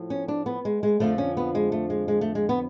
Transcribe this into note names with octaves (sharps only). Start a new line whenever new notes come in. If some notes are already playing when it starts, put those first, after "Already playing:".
Already playing: A2 F3
C#4
D4
B3
G#3
G#3
F2 D3 F3 A3
C#4
B3
G#3
A3
G#3
G#3
A3
G#3
B3